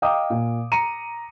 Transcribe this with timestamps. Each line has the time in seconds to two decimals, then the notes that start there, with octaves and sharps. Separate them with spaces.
0.02 D#5 F5 G5 A#5 D6 D#6
0.30 A#2
0.72 A#5 C#7 D#7